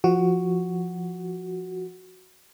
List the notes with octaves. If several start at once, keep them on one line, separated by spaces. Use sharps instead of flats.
F3 F#4